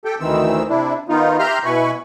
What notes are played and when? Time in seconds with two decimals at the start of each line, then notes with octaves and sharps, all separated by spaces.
0.05 G4 A4 G5
0.20 D2 D#3 E3 C4 E6
0.69 C3 D4 E4
1.09 D#3 B3 D#4 F4
1.39 G4 E5 A#5 C6 F6 G6
1.64 B2 E4 B4 G#5 B5 C#6